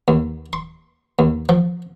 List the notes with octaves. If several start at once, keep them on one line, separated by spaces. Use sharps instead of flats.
D#2
C6
D#2
F3